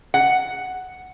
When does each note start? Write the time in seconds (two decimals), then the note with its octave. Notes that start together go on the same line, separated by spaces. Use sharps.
0.14 F#5